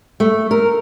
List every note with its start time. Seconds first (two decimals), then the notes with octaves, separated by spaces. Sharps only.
0.20 A3
0.51 A#4